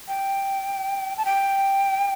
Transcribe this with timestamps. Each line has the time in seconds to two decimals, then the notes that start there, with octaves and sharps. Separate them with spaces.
0.08 G5
1.17 A5
1.25 G5